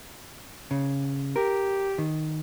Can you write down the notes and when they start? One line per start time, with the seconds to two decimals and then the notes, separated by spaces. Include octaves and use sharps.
0.71 C#3
1.36 G4 A#4
1.98 D#3